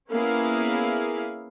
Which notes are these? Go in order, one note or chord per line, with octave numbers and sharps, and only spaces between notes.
A#3 B3 C#4 E4 G#4 F5